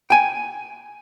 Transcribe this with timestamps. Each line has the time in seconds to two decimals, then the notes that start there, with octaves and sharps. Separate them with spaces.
0.10 G5 G#5